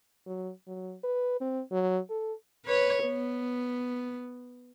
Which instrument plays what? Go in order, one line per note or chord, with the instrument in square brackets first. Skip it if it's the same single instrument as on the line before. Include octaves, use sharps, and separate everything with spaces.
[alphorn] F#3
F#3
B4
C4
F#3
A4
[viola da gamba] B4 C#5
B3